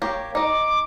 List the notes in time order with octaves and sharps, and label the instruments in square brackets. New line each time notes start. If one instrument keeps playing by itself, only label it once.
[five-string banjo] A#3 G4 C#5
[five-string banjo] D#4 D#5 [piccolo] D6